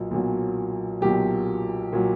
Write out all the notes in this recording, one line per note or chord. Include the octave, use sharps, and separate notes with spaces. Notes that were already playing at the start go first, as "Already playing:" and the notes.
Already playing: B1 A#2 F#3
B1 A#2 F#3
B1 A#2 F#3 G4
A#2 F#3